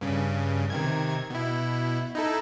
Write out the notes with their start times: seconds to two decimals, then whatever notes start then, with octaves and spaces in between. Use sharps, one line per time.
0.01 G2 C#3
0.70 C3 D#3 G#6
1.30 B2 E4
2.15 D#4 E4 A4